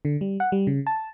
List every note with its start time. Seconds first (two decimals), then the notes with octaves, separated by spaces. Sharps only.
0.05 D3
0.21 G3
0.40 F#5
0.52 G3
0.67 C#3
0.87 A5